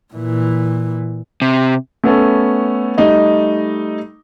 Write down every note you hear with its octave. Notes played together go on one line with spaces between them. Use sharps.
A#2 E3
C3
A3 B3 C#4 A4
G3 A3 D#4 D#5